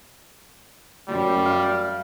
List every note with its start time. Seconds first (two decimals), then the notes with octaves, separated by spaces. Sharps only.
1.08 F#2 G3
1.45 F5